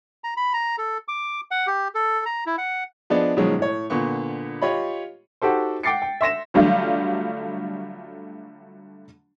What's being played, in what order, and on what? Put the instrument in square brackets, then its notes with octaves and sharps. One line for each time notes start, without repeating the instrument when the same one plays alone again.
[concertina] A#5
B5
A#5
A4
D6
F#5
G4
A4
A#5
E4
F#5
[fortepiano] F3 B3 D4 G#4 D5 D#5
B2 D#3 F3 F#3 G#3 C#4
A2 C#5
A#2 D3 B3 C#6
F4 G4 C#5 D#5 B5
[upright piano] D#4 F#4 G4 A4 C5
F#5 G5 D6 A6 C7 C#7
G5
E5 C6 A#6 E7
[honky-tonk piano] D3 F#3 G3 A3 F4